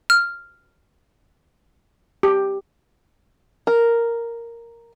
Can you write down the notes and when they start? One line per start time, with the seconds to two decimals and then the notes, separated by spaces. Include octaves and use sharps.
0.10 F6
2.23 G4
3.67 A#4